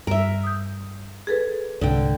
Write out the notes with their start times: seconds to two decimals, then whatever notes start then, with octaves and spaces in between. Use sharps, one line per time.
0.07 G2 A#4 E5
0.44 D#6 G6
1.27 G#4 A4 B4
1.81 C2 G#2 D3 G5